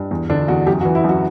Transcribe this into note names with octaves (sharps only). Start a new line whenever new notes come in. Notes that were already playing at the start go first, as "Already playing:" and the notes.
Already playing: G2
E2
D3 D4
E2 F#4
F#2 G4
F#4
E3
E4
F#2 F#4